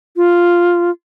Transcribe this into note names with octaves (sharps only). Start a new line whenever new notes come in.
F4